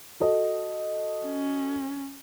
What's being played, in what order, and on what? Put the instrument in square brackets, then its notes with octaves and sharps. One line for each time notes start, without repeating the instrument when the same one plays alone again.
[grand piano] F#4 A4 D#5
[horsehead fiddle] C#4